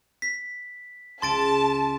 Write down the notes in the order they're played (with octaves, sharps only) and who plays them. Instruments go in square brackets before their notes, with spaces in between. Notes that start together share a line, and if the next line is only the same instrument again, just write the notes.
[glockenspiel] B6
[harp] C#2 [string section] A5 [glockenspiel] C6 A6 D7